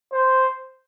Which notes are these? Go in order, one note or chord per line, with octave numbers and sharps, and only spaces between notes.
C5